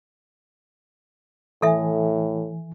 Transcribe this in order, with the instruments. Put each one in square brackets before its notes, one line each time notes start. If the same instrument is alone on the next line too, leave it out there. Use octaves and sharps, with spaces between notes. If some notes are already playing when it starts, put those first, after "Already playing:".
[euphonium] A2 [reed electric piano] E3 G#5 [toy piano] A4 E5